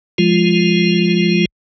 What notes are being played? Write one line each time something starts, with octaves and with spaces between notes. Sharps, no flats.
F3 G#3 F4